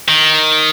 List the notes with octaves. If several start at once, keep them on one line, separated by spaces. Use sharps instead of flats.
D#3